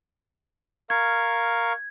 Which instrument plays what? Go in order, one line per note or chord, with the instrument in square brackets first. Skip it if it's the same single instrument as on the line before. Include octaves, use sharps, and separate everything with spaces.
[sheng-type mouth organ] A#4 F5 C#6 [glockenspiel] G#6